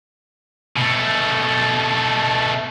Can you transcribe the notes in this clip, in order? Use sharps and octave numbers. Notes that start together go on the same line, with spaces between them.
B2 A3